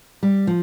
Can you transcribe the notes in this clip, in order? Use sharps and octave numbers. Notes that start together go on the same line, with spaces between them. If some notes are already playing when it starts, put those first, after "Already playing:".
G3
F3